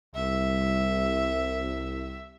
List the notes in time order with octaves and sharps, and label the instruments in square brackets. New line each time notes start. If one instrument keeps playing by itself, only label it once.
[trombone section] C2 [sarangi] E5